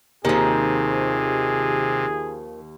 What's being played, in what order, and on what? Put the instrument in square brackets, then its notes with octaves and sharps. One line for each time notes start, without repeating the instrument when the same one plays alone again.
[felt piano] D#2 [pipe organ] C3 [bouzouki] D#3 F3 [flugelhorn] G#4